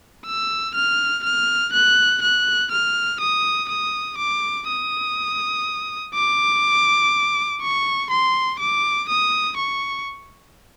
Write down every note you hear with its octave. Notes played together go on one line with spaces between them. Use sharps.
E6
F6
F6
F#6
F#6
F6
D#6
D#6
D6
D#6
D6
C#6
C6
D6
D#6
C#6